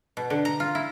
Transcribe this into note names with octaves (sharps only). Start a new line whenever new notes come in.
B2
D3
A#5
F4
E4